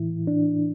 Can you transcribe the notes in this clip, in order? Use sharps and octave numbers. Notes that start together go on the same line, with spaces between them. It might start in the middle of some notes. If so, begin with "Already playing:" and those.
Already playing: A2 E3 E4
D4